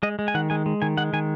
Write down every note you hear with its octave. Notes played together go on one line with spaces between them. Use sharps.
G#3 D#5
G#3
G#5
D#3 F#5
G#3 G#5
G#3
D#3 G#5
G#3 F#5
D#3 G#5